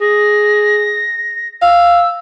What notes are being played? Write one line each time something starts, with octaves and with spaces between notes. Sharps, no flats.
G#4 A#6
F5 E6